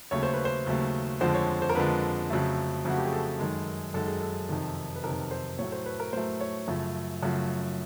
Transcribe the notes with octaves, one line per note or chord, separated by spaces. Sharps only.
D#2 C#3 F#3 A3 C#5
C5
B4
C5
D#2 C#3 F#3 A3
F2 D3 F3 G#3 C5
C#5
C5
A#4
F2 D3 F3 G#3 B4
F2 C#3 F#3 A3
F2 C#3 F#3 A3 F#4
G4
G#4
A4
F#2 D#3 G#3
F#2 D#3 G#3 A4
G#4
A4
F2 C3 D#3
B4
F2 C3 D#3 A#4
C5
A2 F#3 A3 C#5
C5
B4
A#4
A2 F#3 A3 C5
C#5
F#2 C#3 F3 A3
F#2 C#3 F3 A3